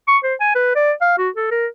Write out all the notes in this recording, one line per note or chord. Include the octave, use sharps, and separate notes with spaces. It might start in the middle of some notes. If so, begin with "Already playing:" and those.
C#6
C5
G#5
B4
D5
F5
F#4
A4
A#4